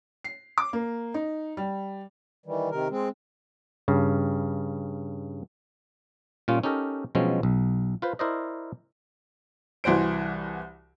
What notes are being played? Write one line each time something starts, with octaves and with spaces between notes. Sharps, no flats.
C7
D6
A#3
D#4
G3
D#3 E3 G3
C3 D#3 A#4
G#3 C4
G2 C#3
A#2 G3 C#4 F4
C#4 D#4 G4 A4 A#4
B2 F3 F#3 G#3 C4 C#4
B1
F4 B4 C5
E4 A#4 C5 D5 D#5
C2 E3 F#4 C5 D7